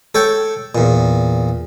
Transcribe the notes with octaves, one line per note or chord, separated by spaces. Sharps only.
A4 C#5 G5
E2 A#2